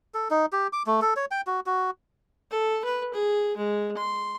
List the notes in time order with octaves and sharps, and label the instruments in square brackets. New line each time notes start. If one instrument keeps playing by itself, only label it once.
[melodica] A4
D#4
G4
D6
A3
A4
C#5
G5
F#4
F#4
[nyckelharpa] A4
B4
G#4
G#3
C6